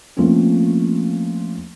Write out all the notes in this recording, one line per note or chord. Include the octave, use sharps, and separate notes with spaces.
F3 A3 A#3 C4 C#4